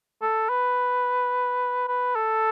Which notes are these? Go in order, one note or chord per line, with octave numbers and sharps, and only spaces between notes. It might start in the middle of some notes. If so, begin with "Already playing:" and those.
A4
B4
B4
A4